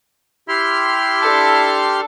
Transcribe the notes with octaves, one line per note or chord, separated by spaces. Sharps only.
E4 G4 C6 F6
D4 A4